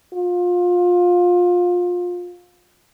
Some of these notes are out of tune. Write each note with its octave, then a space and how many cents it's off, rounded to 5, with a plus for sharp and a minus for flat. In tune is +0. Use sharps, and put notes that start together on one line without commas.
F4 +25